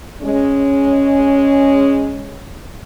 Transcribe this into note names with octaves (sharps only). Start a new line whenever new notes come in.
G#3 C#4